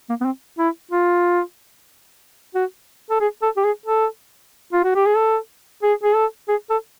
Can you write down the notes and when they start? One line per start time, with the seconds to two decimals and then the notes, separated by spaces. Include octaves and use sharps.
0.09 A#3
0.21 B3
0.25 C4
0.58 E4
0.91 F4
2.55 F#4
3.10 A4
3.20 G#4
3.42 A4
3.57 G4
3.64 G#4
3.86 A4
4.73 F4
4.84 F#4
4.95 G4
5.06 G#4
5.17 A4
5.83 G#4
6.03 G#4
6.15 A4
6.48 G#4
6.70 A4